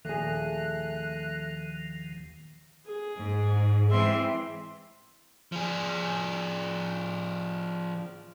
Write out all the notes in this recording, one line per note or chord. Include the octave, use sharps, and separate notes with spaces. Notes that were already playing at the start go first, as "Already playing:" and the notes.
D#2 A#2 D#3 F3 A3 G#4 F#6
G#4
G#2
E3 G#3 C4 E5 C6
F3 G#4